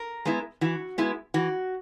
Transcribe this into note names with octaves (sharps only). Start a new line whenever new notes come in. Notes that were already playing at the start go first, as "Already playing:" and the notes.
Already playing: A#4
G#3 B3 E4
E3 F#4
G#3 B3 E4
E3 F#4